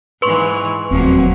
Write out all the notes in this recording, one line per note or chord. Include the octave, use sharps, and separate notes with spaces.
G#2 E3 B4 C6 C#6
E1 D#2 F3 F#3 A#3 C4